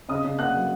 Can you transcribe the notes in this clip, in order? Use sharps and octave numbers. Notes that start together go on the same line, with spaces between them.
C#3 D#5 D#6
C#3
A#3 F#5 F#6
F#3